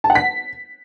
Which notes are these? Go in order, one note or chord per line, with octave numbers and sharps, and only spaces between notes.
A5
F#5
B6